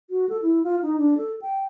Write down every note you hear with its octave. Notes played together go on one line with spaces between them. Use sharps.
F#4
A4
E4
F4
D#4
D4
A4
G5